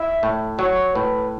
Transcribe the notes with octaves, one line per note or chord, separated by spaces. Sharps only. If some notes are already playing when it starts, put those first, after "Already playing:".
Already playing: E4 E5
A2
F#3 C#5
A2 B4